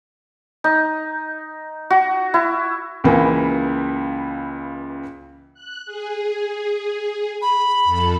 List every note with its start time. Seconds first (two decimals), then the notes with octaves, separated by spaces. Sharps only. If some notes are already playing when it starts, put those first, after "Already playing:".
0.64 D#4
1.90 F#4
2.34 E4
3.04 C#2 C#3 E3 A#3
5.54 F#6
5.86 G#4
7.42 B5
7.85 F2 A4